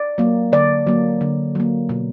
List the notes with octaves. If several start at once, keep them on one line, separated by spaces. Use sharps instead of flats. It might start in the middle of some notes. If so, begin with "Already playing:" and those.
Already playing: D5
F#3 A#3
D3 D5
F#3 A#3
D3
F#3 A#3
B2